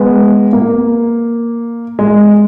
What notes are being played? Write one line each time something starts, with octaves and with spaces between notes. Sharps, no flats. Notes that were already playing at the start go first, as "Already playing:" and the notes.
Already playing: G#3 B3
A#3
G#3